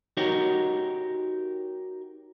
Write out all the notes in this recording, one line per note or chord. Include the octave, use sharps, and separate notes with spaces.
D#4 F#4 G4 A#4 C#5